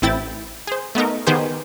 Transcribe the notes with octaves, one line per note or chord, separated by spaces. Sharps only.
A1 C4 E4 G5 A6
G#4 C5
A3 B3 D#4 A#4
D#3 B3 G4 G#4 C5